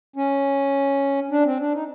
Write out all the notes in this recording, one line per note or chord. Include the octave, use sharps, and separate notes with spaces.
C#4
D4
C4
D4
D#4